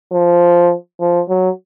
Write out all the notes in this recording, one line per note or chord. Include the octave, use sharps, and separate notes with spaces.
F3
F3
F#3